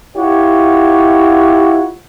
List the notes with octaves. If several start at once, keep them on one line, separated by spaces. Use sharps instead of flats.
E4 F4 G4 C#5 F#5